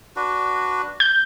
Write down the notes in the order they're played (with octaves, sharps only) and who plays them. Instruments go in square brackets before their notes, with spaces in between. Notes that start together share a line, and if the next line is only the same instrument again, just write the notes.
[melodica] D4 F#4 B4
[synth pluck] G6